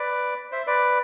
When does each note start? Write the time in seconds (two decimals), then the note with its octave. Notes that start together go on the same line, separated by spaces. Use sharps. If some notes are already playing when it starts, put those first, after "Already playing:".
Already playing: B4 D5
0.52 C5 E5
0.67 B4 D5